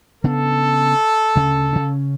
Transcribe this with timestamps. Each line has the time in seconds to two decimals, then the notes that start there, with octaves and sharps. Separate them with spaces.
0.24 C#3 B3 D4 A4
1.36 D2 C#3 C#4
1.73 C#3 C#4